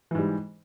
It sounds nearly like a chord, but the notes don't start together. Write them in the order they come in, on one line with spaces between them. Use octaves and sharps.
E3 G#2 G3